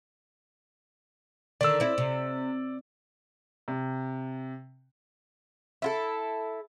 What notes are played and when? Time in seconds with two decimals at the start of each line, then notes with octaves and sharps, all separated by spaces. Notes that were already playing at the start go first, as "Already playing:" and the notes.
1.61 D3 D#3 D5 E6
1.80 C4 E4
1.98 C3
3.68 C3
5.82 E4 F4 A4